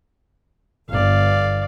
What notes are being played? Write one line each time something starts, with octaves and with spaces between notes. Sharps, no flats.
G1 D5 F5